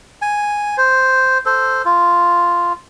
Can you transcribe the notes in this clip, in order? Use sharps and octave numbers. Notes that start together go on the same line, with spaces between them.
G#5
C5
A4 C5
F4